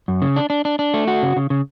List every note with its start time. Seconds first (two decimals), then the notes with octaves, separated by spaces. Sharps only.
0.08 F#2
0.22 C#3
0.36 D4
0.50 D4
0.65 D4
0.79 D4
0.94 A3
1.08 F#4
1.22 C#3
1.36 C#3
1.50 C#3